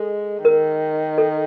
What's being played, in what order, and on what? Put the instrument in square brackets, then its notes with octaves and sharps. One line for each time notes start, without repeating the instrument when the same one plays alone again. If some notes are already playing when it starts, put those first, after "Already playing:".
Already playing: [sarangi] G#3 [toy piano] A4
[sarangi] D#3 [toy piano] A#4
[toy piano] A4